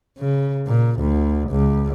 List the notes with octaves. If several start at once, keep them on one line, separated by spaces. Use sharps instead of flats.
C#3
A#2
D2
C#2